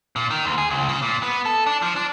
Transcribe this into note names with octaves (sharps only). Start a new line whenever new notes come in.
A#2
D#3
D2
G#4
C#2
C#3
A#2
B3
A4
D4
F3
D4